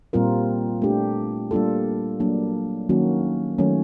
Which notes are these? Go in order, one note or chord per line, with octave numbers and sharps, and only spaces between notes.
A#2 G3 C4 F4 A#4
A3 D4 G4
G3 A#3 D4 F4 A4
F#3 A#3 D4
D#3 F#3 A#3 C#4 F#4
D#3 F#3 A3 C#4